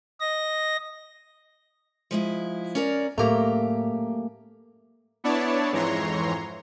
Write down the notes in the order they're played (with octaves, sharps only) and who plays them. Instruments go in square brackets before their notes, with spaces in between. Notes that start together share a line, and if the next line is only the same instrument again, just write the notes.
[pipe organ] D#5 A#6
[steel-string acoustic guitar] F3 G#3 E4
C#4 A#4 D5
[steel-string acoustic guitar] F#2 G4 A#5 [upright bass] A2 [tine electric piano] A3 A#3
[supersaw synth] B3 D4 E4 C#5 D5 A5
F2 G#2 E3 C#5 A#5 C6